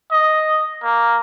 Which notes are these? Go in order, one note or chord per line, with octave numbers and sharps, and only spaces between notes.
D#5
A#3